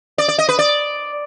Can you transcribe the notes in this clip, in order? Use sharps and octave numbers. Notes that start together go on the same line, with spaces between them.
D5
D5
D#5
B4
D5